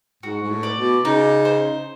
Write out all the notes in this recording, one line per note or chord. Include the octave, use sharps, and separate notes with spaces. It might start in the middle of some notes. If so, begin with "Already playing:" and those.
G#2 F#4
G#2
A2
D5
B2
C#3 D#4
C5